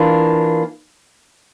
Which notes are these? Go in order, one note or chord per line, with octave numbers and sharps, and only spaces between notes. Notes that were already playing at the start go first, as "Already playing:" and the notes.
Already playing: E3 A#3 D4 F4